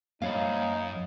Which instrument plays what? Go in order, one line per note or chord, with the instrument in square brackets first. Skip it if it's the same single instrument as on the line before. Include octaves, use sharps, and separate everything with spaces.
[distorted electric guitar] F#2 [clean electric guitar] A#3 C#5 B5 [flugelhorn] D#4 [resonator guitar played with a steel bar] F5